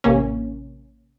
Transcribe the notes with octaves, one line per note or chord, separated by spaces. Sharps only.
A1 C3 A#3 C#4